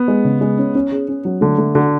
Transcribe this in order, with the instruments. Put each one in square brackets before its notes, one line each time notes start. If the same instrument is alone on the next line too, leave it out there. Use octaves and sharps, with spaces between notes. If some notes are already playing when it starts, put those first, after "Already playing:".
Already playing: [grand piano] B3
[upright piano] G#3
C#3
G#3
C#4
C#4
G#4
C#4
F#3
[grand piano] D3 [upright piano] A3
[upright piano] A3
[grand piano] D3 [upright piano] F#4